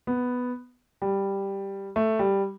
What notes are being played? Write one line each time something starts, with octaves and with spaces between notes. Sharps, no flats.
B3
G3
A3
G3